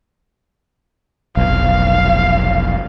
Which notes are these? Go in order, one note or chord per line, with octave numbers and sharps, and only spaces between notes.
F1 B1 F5